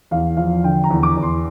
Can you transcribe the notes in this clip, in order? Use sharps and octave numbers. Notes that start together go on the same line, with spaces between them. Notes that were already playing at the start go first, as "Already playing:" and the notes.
E2 F5
F3 F5
D3 G5
A#5
E2
D6
E2
C6